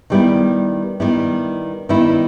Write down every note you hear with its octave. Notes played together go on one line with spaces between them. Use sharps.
D#3 G3 B3 E4
D#3 G3 B3 E4
D#3 G3 B3 E4